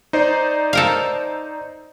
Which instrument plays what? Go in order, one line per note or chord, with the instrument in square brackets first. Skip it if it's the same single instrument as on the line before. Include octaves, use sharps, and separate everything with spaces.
[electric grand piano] D#4 C5 D5
[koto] A4 A#4 F5